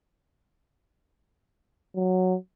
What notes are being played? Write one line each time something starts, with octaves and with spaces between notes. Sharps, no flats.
F#3